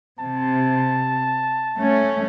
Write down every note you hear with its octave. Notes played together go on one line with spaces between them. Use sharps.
C3 A5
A3 C#4